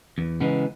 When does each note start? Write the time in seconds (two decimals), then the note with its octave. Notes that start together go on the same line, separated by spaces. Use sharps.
0.18 E2
0.41 C#3 E3 G#3 B3